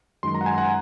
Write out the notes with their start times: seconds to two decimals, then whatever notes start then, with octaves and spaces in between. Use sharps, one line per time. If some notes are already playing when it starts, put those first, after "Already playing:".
0.23 F#2 D#3 G#3 C6
0.34 A#5
0.41 F#5
0.46 G#5
0.58 F#5